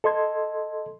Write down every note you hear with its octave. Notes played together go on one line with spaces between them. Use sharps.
A4 D#5 C6 G#6